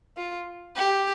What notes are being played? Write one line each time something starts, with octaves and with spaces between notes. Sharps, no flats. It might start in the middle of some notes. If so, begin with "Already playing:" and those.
F4
G4